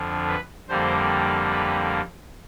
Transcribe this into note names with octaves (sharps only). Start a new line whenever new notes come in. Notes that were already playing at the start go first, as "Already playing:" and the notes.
Already playing: F2 D3 F3
B4
F2 D3 G3 A#3 C5
B4